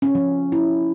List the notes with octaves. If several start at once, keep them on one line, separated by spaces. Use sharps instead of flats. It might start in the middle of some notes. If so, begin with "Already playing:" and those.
C#4
F3
E4